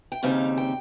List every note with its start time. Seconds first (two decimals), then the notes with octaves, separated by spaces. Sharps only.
0.12 G5
0.23 D#2 C#3 G3 C4 D#4 F5
0.58 G5